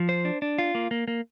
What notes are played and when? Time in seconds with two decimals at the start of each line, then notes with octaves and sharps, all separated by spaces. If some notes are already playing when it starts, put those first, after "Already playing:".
Already playing: F3
0.09 C5
0.25 D4
0.42 D4
0.58 F4
0.75 A#3
0.91 A#3
1.08 A#3